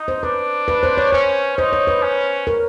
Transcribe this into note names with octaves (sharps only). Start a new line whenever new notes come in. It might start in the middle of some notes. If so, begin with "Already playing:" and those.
Already playing: D#4
C5
D4 B4
B4
C5
C#5
C#4 C5
D#4 C5
C#5
B4
C#4
A#4